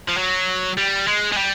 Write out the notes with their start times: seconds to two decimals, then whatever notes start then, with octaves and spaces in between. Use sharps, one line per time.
0.08 F3
0.17 F#3
0.77 G3
1.07 G#3
1.32 G#3
1.37 G3